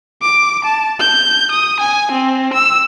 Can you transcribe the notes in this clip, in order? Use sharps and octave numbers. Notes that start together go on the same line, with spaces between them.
D6
A5
G6
D#6
G#5
C4
E6